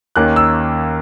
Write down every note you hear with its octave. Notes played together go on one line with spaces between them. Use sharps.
D#2 D#3 A#3 C#4 F#6
E6